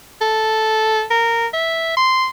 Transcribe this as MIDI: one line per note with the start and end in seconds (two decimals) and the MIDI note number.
0.21 1.04 69
1.11 1.47 70
1.53 1.95 76
1.97 2.28 84